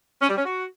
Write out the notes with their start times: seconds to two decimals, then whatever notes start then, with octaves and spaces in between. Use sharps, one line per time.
0.22 C#4
0.29 G3
0.37 C#4
0.45 F#4